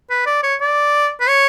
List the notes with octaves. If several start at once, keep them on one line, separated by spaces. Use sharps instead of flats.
B4
D5
C#5
D5
B4
C#5